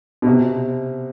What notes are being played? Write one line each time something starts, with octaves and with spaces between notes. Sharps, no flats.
B2
C3